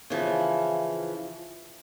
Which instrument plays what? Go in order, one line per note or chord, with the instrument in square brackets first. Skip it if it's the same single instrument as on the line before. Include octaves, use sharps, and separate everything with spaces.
[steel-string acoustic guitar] C#3 E3 F3